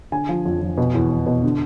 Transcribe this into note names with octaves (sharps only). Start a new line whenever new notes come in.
D3 G#5
F3
F2
F2
B2
E2
E2
B2
D3